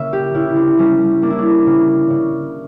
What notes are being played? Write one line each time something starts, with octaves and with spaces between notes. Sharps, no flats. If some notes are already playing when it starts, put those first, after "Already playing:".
Already playing: C#3 A#3 E5
G4
C#3 E4
D4
G3 C#4
A#3 D4
E4
D4
C#3
C#3